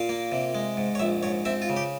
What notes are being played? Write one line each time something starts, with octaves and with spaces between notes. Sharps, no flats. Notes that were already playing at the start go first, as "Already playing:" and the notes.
Already playing: A#2 F5
A#3
C3
G#3
G#2
C#5
A#1 E5
G#2 C#5
C4 E5
F4
C#3
G4